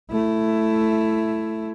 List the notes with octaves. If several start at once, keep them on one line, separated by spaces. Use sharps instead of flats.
A3 E4